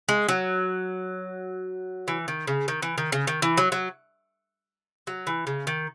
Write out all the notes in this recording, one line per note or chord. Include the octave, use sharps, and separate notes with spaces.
G#3
F#3
E3
D#3
C#3
D#3
E3
D#3
C#3
D#3
E3
F#3
F#3
F#3
E3
C#3
D#3